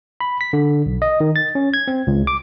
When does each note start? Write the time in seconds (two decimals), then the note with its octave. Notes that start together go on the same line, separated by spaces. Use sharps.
0.21 B5
0.41 B6
0.53 D3
0.86 B1
1.02 D#5
1.20 D#3
1.36 A6
1.55 C#4
1.74 G#6
1.88 C4
2.07 C#2
2.27 D6